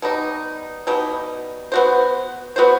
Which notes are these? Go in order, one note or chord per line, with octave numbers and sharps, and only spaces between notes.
B2 G3 D#4
B2 G3 D#4
B3 F#4 C5
B3 F#4 C5